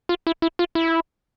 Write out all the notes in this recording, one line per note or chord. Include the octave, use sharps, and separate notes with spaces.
F4
E4
E4
F4
E4